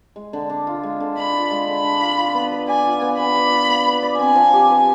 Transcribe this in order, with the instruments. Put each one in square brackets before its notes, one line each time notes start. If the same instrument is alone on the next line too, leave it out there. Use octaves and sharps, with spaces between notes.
[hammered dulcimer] G#3
D3
D4
F4
G#3
D3
[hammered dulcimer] D4 [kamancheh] B5
[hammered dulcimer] F4
G#3
[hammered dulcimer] D3 [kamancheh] B5
[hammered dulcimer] D4
F4
F4
B3
B4
[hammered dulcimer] D5 [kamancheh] G#5
[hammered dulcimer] F4
B3
[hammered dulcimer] B4 [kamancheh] B5
[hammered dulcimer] D5
F4
B3
B4
D5
[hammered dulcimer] C4 [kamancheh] G#5
[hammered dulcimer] F3
G4
B4